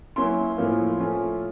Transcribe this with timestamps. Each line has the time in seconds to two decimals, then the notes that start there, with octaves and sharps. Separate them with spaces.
0.16 F#3 A#3 C#4 E4 C6
0.57 A2 F3 A#3 C#4 F4
0.98 F3 A3 C#4 F4